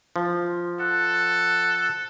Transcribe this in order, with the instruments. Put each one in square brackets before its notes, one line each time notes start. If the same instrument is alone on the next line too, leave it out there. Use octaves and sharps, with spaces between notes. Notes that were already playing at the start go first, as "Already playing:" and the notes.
[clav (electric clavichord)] F3
[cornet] A4 [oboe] F#5